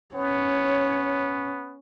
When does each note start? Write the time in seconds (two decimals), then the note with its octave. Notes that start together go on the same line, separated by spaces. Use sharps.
0.15 B3 C#4 C#5